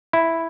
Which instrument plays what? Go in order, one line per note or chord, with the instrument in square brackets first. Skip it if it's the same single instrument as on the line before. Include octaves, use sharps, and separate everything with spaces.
[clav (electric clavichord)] E4